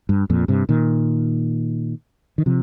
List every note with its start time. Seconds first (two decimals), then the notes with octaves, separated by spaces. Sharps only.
0.09 G2
0.30 F2 A#2
0.48 G2 C3
0.69 A#2 D#3
2.38 D#3
2.46 C3 F3